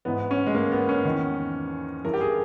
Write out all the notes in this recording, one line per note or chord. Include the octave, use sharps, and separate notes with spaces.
G#2 E3 B3
C#4
G#3
A#3
B3
C#4
E2 D#3
G2 E3 A#4
G4
G#4